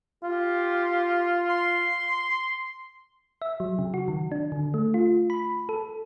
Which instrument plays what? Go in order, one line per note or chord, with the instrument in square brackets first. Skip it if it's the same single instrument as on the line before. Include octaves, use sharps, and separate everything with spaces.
[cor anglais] F4 [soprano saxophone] G4
[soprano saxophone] C6
[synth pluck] E5
F#3
C#3
F#4
D#3
D4
D3
A3
F4
B5
A4